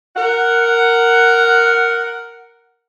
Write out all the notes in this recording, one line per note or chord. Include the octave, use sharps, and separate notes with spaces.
A#4 F#5